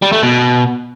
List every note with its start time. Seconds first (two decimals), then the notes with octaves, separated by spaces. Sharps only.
0.02 G3
0.12 A3
0.23 B2